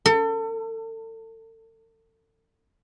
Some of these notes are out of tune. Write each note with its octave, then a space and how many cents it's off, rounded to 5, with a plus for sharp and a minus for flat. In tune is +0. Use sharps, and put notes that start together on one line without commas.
A4 +35